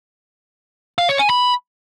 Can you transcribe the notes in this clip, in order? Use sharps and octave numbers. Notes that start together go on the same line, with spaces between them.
F5
C#5
G#5
B5